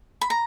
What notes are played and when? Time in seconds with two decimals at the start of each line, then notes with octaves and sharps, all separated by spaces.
0.21 B5
0.30 A#5